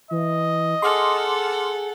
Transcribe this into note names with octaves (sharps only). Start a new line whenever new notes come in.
E3 D#5
G#4 A4 F#5 C6 D6 F6